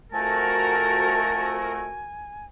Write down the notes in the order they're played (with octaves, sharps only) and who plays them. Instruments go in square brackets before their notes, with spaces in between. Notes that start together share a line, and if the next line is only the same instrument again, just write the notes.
[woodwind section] F2 F3 A3 [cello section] F#4 A#4 [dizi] G#5 [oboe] A5